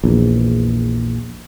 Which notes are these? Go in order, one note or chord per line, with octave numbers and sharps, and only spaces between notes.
A#1 E2